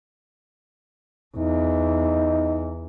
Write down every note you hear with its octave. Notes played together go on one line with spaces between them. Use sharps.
E2 D#4